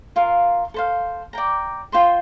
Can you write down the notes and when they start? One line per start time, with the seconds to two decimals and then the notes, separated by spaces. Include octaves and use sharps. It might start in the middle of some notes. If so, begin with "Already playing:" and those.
0.16 F4 A#4 F5
0.74 A4 C5 F5
1.33 D5 G5 A#5
1.92 F4 C5 G5 C6